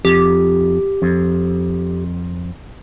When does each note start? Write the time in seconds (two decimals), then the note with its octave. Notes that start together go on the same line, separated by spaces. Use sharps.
0.05 F2 G4
1.02 F2